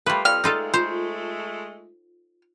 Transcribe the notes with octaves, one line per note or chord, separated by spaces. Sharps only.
G3 A3 A#3 F4 A4 B4
F2 D5 F5 G5 F6
G#3 A3 D#4 F4 A4 D6
F4 C5